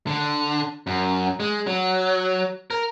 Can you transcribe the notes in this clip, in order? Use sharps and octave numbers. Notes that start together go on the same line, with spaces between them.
D3
F#2
G#3
F#3
A#4